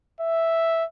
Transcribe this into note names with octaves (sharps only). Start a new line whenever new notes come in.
E5